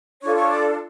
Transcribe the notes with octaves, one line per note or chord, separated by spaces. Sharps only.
D4 F4 A4 C#5 C#6
C#5 C#6
D5 D6